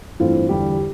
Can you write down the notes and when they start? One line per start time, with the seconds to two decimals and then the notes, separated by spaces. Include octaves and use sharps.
0.20 G2 E3 A3 C4 F4
0.49 E2 D3 G3 G4